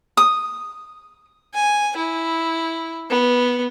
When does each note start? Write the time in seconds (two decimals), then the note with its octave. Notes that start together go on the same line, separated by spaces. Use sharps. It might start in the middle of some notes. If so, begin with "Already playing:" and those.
0.17 D#6
1.54 G#5
1.97 E4
3.10 B3